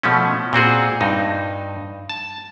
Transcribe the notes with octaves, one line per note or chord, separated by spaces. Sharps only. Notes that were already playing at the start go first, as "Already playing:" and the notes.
B2 F3 A3 C#4
A#2 C4 F#4 G#4
G2 D#4
A5